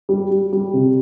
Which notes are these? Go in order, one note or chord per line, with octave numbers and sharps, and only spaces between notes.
G3
G3
G3
C3